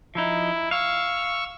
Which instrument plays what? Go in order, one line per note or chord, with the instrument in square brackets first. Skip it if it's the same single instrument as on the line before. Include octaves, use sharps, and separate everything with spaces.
[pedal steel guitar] F3 D#4 [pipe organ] E4
[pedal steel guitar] F5 [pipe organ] C#6 E6